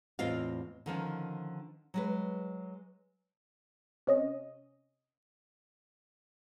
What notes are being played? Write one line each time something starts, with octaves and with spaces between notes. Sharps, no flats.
E2 A2 C4 F4 D#5 F5
D3 D#3 F3 C#4
F#3 G#3 B4
C3 C#4 D#5